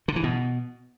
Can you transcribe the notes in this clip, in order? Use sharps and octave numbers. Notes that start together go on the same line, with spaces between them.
D3
E3
B2